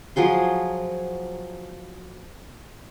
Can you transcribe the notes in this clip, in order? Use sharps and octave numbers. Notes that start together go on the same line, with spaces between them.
F3 F#3 G#4 C6